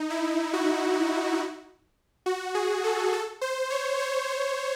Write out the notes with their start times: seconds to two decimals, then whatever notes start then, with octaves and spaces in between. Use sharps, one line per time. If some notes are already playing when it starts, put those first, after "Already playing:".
Already playing: D#4
0.10 E4
0.53 F#4
2.26 F#4
2.55 G#4
2.84 A4
3.13 A4
3.41 C5
3.70 C#5
3.99 C#5
4.27 C5